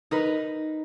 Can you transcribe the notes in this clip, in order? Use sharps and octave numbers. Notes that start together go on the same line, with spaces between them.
D#4 A#4 B4